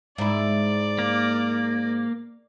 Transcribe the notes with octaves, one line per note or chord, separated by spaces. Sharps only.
G#2 E4 D5
A#3